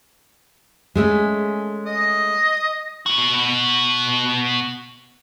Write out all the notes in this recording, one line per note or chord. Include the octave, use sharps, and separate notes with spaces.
G#3 A3 C#4
D#5
B2 F#4